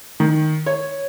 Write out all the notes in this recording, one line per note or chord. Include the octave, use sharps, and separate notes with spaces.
D#3
C#5